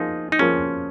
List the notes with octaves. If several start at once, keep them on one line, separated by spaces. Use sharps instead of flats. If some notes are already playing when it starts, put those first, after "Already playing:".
Already playing: F3 A#3 D#4 F4 G#4
D#4
F3 A#3 C#4 F4 G#4